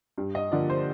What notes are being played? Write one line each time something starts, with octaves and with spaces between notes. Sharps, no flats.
G2
D#5
D3 F3 A#3 D5
C5